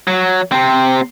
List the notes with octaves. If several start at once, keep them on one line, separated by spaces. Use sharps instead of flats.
F#3
C3 C4